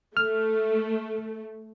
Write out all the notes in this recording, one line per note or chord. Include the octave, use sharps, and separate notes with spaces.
A3 F6